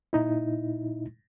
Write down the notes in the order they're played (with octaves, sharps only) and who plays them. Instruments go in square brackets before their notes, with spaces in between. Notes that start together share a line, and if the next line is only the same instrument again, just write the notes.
[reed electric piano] A#2 D#4 E4